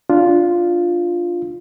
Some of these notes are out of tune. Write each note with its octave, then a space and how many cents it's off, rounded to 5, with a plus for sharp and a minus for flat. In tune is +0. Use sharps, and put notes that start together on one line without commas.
D4 +0 F4 +0